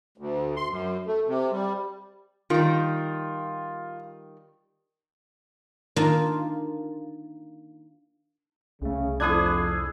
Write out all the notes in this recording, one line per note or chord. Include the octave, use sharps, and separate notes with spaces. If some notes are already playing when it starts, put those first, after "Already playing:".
D2
C6
F#2
A3
C3
G3
D#3 G3 F4
D#3 A#3 D4 F4
C2 C#3 A3
F2 D4 E4 G#4 D#6 F#6 G#6